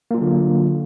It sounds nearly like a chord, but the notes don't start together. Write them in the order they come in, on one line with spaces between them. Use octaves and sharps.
A#3 F4 F#3 D3